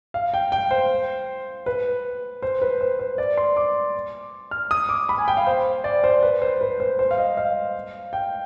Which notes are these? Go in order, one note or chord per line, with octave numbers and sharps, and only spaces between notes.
F5
G5
G5
C5
B4
C5
B4
C5
C5
D5
C6
D6
F6
D#6
D6
B5
G#5
G5
F5
C5
D5
C5
B4
C5
B4
C5
C5
F5
D#5
F5
G5